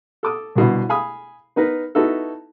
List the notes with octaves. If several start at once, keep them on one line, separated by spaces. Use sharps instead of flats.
A4 D6 D#6
C2 G2 B2 D3
F5 G#5 B5 D#6
B3 D#4 A#4 B4
B3 D#4 E4 F#4 A4